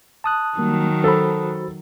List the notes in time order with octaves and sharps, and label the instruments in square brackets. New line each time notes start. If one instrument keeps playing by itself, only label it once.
[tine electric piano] A5 D#6 F#6
[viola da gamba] D#3 F#3 [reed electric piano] G3 A#3
[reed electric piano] F#4 C5 B5 [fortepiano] A4